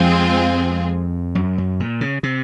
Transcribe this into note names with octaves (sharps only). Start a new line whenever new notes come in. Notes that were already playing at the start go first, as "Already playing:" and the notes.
Already playing: F2 F3 G#3 C4 F4 G#4
F#2
F#2
A#2
C#3
C3